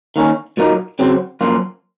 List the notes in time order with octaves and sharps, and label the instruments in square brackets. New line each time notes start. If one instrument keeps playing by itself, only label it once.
[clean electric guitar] D#3 A#3 C#4
A#2 F#3 A#3 D#4
C#3 F#3 C4
F#2 F3 A#3 F4